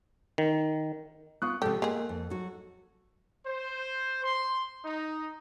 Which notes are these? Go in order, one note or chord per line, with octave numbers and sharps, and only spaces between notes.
D#3
B3 F4 C#6 D#6 F#6
C3 F3 G#3 G4 A4
G#3 A#3 G#4
F2
F#3 F#4
C5
C6
D#4